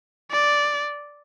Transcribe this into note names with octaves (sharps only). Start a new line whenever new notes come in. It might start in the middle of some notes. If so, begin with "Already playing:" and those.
D5